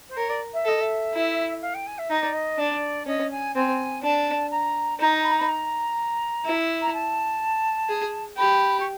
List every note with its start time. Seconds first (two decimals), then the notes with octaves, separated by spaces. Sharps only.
0.09 C5
0.17 A#4 C#5
0.29 D5
0.53 E5
0.65 A4 D#5
0.80 E5
1.14 E4
1.61 F5
1.74 G5
1.86 G#5
1.98 E5
2.10 D#4 D#5
2.22 D5
2.33 D#5
2.58 D4 D5
3.06 C#4 D#5
3.30 G#5
3.55 C4 G#5
4.03 D4 A5
4.51 A#5
4.99 D#4 A#5
5.24 B5
5.31 A#5
5.39 B5
5.48 A#5
6.45 E4
6.82 A#5
6.93 A5
7.89 G#4
8.37 G4 B5
8.79 C#6